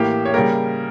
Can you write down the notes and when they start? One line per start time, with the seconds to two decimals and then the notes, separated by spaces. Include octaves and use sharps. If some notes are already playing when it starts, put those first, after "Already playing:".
Already playing: A2 E3 A#3 G4
0.25 C#5
0.34 C#3 G3 A#3 A#4